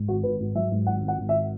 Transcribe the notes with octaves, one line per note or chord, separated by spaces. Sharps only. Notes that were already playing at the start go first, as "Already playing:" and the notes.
Already playing: G#2
G#1 F#4
G#1 B4
G#2
F#3 E5
G#2
G#1 F#5
G#1
F#5
G#1
E5